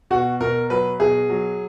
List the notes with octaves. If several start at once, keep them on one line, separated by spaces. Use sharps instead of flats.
B2 F#4
B2 A#4
F#3 B4
B2 G#4
F#3